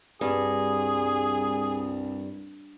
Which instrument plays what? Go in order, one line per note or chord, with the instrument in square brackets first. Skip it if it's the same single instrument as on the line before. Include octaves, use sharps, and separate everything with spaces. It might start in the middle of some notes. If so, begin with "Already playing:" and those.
[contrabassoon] C2 [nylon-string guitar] G2 [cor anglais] G#4